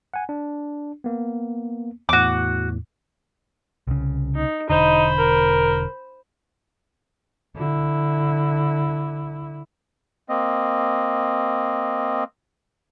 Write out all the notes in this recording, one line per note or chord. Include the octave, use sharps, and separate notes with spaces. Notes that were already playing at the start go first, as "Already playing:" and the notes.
F#5 G#5
D4
A#3 B3
E2 A2 F#4 D6
C2 C#3
D#4
E1 D3 D#4 C5 B5
A#4
D3 E4
A#3 C4 D#5